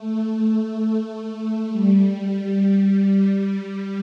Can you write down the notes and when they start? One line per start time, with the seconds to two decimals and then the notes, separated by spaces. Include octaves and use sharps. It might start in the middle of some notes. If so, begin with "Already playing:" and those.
Already playing: A3
1.71 G3